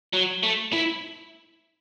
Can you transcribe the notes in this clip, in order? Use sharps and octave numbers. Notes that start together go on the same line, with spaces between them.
F#3
A3
E4